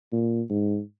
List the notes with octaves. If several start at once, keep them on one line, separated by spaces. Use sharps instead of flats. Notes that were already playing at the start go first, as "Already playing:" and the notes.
A#2
G#2